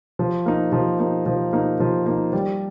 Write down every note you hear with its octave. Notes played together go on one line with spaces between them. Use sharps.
F3
A#3 D#4
F3
A#3 D#4
F3
A#3 D#4
F3
A#3 D#4
G3